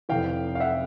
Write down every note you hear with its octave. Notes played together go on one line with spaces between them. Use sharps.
F1 F2 C3 E3 F5 G5
F5
E5 F#5